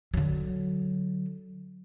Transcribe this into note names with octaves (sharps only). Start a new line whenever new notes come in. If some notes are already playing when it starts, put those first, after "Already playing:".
D3 F#3